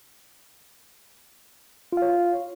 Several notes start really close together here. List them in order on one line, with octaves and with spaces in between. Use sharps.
F4 F5 C#5